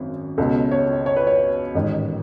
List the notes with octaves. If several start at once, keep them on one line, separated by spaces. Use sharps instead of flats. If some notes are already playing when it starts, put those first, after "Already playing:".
Already playing: G#1 F#2
C#2 B2 A4
C#5
C#5
B4
C#5
A1 G#2 D#3